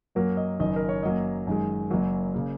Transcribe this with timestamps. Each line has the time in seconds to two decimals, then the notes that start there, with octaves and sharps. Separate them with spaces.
0.15 F#2 F#3 A#3 A#4
0.37 D#5
0.60 F#1 F#2 D#3 D#5
0.76 A#4
0.89 C#5
1.03 F#2 F#3 A#3 D#5
1.47 F#2 D#3 G#3
1.90 F#1 F#2 F#3 A#3
2.34 C#3 A#3